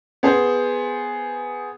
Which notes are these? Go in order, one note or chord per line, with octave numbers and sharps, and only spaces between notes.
B3 G#4 C5